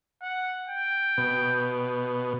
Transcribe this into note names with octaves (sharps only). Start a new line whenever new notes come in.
F#5
G5
B2